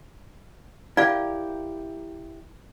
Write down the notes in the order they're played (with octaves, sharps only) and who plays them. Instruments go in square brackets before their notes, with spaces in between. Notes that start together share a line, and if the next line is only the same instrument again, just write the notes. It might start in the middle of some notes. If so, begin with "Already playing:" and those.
[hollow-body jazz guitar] E4 G4 A#4 [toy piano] D5 F5